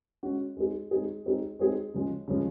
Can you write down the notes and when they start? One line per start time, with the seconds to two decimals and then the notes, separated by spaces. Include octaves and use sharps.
0.23 G#3 C#4 F#4
0.57 G#3 C4 D#4 G#4
0.91 G#3 C4 D#4 G#4
1.25 G#3 C4 D#4 G#4
1.59 G#3 C4 D#4 G#4
1.94 C#3 F3 G#3
2.28 C#3 F3 G#3